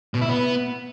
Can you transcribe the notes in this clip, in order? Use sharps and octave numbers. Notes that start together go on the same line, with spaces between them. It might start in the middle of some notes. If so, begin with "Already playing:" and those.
B2
E4
B3